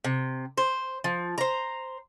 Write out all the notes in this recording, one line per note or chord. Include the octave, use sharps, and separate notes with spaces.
C3
C5
F3
C5 A#5